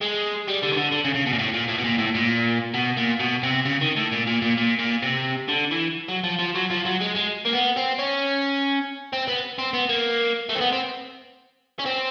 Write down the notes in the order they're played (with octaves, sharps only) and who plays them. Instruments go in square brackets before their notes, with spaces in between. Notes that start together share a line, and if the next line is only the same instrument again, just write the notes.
[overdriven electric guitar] G#3
G3
D3
D#3
D3
D3
C#3
C#3
B2
A#2
A2
A#2
A2
B2
A#2
A2
A#2
B2
A#2
B2
C3
C#3
D#3
A2
A#2
A#2
A#2
A#2
A#2
C3
D3
E3
F#3
F3
F3
F#3
F3
F#3
G#3
G#3
A#3
B3
C4
C#4
C4
B3
C4
B3
A#3
A3
C4
B3
C4
C#4
C4